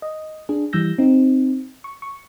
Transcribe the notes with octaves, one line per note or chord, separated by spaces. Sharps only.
D#5
D4 G#4
E3 G3 E6 G6 A#6
C4 D#4
C#6
C#6